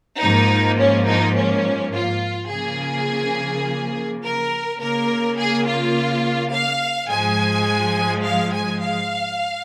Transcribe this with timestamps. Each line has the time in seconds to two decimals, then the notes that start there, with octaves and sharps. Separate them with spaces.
0.20 G#2 F3 A#3 D#4
0.78 C#4
1.07 D#4
1.36 C#4
1.93 F4
2.50 C#3 F3 A#3 G#4
4.23 A#4
4.80 C#3 A#3 A#4
5.37 G#4
5.66 F4
6.52 F5
7.10 G#2 F3 G#3 G#5
8.24 F5
8.53 G#5
8.81 F5